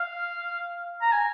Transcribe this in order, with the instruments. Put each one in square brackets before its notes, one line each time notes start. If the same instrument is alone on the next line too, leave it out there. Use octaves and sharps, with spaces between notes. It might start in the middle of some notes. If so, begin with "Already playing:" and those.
Already playing: [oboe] F5
A#5
G#5